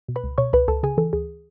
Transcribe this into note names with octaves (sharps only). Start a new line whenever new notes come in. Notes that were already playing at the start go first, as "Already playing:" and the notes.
B2
B4 B5
C#2
B2 C#5 C#6
C#2 B4 B5
C#2 A4 A5
C#3 G#4 G#5
E3 A4
D2 G#4